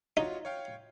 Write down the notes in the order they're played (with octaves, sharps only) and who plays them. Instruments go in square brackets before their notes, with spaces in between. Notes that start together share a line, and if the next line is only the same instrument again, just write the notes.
[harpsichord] D#4 [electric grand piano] F4 F#4 C#5
[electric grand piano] C#5 F5 G5